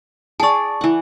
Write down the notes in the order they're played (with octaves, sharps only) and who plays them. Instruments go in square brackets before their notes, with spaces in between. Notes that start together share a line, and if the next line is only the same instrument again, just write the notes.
[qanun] G#4 D5 [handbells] A5 C#6
[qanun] E3 F#5